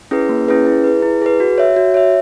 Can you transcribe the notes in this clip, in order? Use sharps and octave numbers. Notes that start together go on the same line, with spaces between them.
C#4 E4 G#4 B4
A#3
C#4 E4 G#4 B4
E4
G#4 B4
E4
G#4 B4
F#4
C#5 E5
F#4
C#5 E5